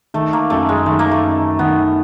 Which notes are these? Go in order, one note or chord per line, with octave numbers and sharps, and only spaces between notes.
D#3 A3
A#3
F#2 A3
G#3
D#3 A3
A#3
A3
F#2
D#3 B3